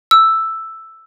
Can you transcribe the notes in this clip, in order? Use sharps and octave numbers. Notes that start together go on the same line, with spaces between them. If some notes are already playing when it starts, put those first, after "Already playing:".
E6